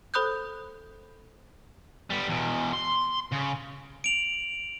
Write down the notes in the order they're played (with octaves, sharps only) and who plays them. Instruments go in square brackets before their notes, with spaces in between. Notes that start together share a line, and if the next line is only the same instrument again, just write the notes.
[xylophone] A4 C5 B5 D#6 F#6 G6
[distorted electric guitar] G3 B3
E2 B2
C6
C#3
[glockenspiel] D7 F7 F#7